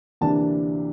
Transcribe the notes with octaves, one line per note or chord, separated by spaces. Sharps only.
D2 C3 E3 A#3 D4 A5